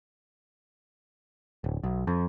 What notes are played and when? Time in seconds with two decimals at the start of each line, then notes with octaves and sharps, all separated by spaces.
1.64 D1
1.83 B1
2.07 F2